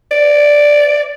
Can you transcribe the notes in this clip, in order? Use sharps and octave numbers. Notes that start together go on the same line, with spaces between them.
D5